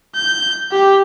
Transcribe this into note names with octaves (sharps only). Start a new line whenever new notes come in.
G6
G4